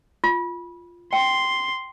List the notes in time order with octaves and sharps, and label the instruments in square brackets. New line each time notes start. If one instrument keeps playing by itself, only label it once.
[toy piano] F4
[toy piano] G5 [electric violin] C6